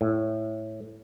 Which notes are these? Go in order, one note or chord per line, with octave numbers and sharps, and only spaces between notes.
A2